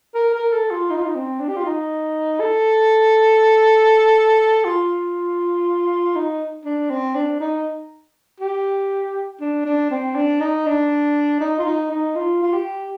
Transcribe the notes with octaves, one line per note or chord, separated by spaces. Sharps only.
A#4
A#4
A4
F4
D#4
F4
D#4
C4
D4
G4
F4
D#4
A4
F4
D#4
D4
C4
D4
D#4
G4
D4
D4
C4
D4
D#4
D4
D#4
F4
D#4
D#4
F4
F4
G4